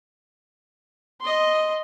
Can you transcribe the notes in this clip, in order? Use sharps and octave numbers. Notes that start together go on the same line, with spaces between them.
D#5 C6